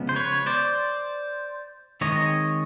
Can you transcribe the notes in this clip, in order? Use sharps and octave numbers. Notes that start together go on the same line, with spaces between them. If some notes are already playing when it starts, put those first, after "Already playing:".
Already playing: C#3 F3 G#3 B3
C5
B4 C#5
C5 D5
D#3 G#3 C4 C#5 D#5